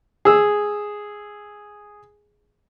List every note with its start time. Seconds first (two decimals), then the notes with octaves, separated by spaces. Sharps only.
0.25 G#4 E6